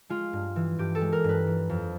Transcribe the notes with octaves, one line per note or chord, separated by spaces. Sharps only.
G#3 F4
G2
E3
G2 G4
A4
G#3
A#4
G2 B4
E3
F2